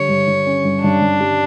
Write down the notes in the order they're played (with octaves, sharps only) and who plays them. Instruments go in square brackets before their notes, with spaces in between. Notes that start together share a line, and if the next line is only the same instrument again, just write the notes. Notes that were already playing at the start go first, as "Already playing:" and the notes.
Already playing: [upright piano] D3 G3 [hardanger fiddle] C#5
[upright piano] G2
G2
C#4
G2
[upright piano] G2 [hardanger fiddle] D4
[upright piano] G2
G3